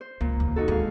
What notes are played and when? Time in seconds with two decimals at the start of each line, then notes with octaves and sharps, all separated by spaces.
0.01 C5
0.21 C#2 A#2
0.40 D#2
0.56 D#4 F#4 A4
0.68 D#2 G#2 F5